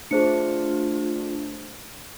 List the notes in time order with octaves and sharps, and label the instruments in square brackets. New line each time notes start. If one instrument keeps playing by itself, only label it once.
[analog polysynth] A3 D4 [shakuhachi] F4 [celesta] G#4 C5 C#7